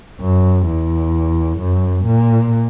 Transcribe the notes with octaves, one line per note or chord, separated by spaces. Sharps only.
F#2
E2
F#2
A#2